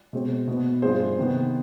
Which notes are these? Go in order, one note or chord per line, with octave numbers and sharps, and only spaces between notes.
B2 G#3 C4
B2 B3
G2 F3 C4 G#4 C5
C3 D#3 B3